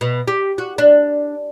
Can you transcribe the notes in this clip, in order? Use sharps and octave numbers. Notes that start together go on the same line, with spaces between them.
B2
G4
F#4
D4